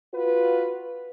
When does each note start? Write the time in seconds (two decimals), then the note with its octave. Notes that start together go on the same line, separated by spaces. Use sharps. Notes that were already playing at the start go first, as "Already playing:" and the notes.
0.13 F4 F#4 B4